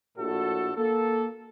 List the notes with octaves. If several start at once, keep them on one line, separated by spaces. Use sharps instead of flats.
A#1 A2 F#4 A4
A#3 A4